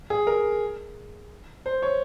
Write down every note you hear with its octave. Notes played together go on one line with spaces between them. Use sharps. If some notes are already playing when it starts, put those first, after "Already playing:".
G#4
A#4
C5
C#5